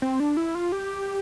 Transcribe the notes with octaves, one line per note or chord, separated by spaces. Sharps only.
C4
D4
E4
F4
G4